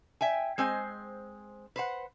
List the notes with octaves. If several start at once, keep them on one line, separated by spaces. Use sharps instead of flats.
E5 G5 G#5
G#3 C4 C5 G#5
B4 C5 F#5